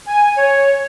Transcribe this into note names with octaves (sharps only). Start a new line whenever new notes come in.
G#5
C#5